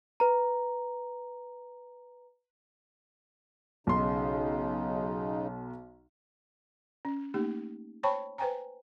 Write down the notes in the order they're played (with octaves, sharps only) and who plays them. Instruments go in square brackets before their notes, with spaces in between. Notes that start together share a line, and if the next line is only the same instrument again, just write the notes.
[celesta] B4 A#5
[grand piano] B1 C6 [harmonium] C#3 D#4
[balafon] C#4
A3 A#3 D#4 G4
C5 C#5 G5 A5 B5 C#6
B4 C5 G5 G#5 A#5